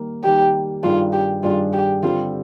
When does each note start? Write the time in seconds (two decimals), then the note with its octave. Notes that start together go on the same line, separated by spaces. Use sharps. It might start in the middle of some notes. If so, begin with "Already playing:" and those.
Already playing: D#3 G3 A#3
0.23 D#3 G3 A#3 G4
0.83 G2 D#3 G3 D4 F4 G#4
1.13 G4
1.43 G2 D#3 G3 D4 F4 G#4
1.73 G4
2.03 D3 G3 C4 F4